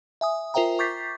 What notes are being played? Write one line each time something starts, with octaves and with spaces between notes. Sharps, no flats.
E5 G#5 D#6
F4 A#4 C5 E5 G5 A#5
C#6 D6 G6 A6 B6 C7